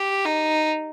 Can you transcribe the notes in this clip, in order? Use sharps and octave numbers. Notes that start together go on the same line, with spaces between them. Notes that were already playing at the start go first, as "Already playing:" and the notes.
Already playing: G4
D#4